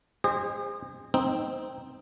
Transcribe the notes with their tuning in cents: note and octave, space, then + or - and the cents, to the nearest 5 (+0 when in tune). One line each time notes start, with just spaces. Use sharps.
G#4 -40 C5 +0 D#5 -25
C4 -5 D#4 +0